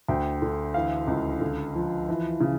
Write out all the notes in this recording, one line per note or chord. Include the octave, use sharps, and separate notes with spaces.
D2 G5
D3
E3 F5
C#2
D3
F3
E3
C#3